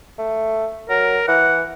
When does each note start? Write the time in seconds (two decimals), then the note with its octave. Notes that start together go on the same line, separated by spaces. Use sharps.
0.18 A3
0.89 F#3 A#4
1.28 E3 F#5